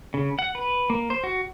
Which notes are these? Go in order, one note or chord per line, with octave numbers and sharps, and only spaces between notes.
C#3
F#5
B4
A#3
C5
F#4